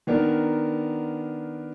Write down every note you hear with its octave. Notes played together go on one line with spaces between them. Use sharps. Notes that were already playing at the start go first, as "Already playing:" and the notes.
D#3 B3 D4 A#4